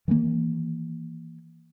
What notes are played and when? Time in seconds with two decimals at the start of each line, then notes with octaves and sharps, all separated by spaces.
0.08 D#3 E3 G#3 A#3